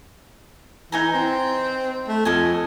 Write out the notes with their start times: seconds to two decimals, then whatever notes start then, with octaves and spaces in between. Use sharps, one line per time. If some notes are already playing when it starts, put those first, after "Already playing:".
0.92 E3 D#4 G#5 A#5
1.14 C4
2.08 A3
2.25 F2 A4 D#5 G#5